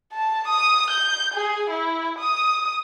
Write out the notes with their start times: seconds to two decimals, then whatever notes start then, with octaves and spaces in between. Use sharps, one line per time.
0.13 A5
0.48 D#6
0.90 G6
1.34 G#4
1.70 E4
2.19 D#6